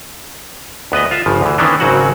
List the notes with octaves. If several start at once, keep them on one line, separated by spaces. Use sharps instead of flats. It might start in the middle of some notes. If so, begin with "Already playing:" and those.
D2 B3 B4 D#5
F4 E5
G1 C#3 F3
D2 E3
D#3 E3 B3 C#4 D4
G#1 C#3 F#3 C4 F#4 F#5